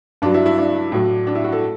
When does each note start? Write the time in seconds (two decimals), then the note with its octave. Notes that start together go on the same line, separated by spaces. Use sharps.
0.22 G2 F#3 D4
0.34 E4
0.46 E4
0.58 D4
0.92 A2 F#3
1.27 D4
1.35 E4
1.44 F#4
1.53 A4